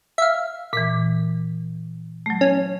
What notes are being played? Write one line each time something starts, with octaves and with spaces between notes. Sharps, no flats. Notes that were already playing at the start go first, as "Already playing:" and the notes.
E5 F5
A#2 E3 B6
F#3 A3
C#4